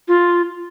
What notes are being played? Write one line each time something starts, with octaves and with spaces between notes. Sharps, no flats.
F4